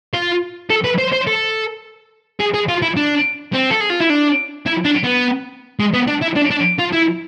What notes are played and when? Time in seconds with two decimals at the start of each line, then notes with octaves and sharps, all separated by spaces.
0.14 F4
0.70 A4
0.84 B4
0.99 C5
1.13 C5
1.27 A4
2.40 G#4
2.54 G#4
2.68 F4
2.82 E4
2.96 D4
3.53 C4
3.70 A4
3.80 G#4
3.90 F4
4.00 E4
4.10 D4
4.66 E4
4.85 D4
5.04 B3
5.80 G#3
5.94 B3
6.08 D4
6.22 E4
6.36 D4
6.50 D4
6.79 F4
6.92 E4